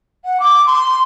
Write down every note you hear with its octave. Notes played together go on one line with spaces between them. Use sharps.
F#5
D6
C6